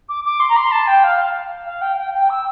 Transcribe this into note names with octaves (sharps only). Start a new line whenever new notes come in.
D6
D6
C6
A#5
C6
A5
G5
F5
F5
G5
G5
G5
E6